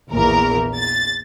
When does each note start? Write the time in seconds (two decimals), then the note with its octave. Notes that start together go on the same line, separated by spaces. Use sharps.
0.11 A#1 E2 A#4
0.76 A6